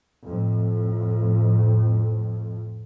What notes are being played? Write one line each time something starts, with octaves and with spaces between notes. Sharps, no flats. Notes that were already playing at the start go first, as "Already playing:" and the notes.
F2 A2